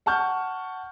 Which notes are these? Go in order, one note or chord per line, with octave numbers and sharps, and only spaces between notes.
F#5 A5 C#6 F6 G6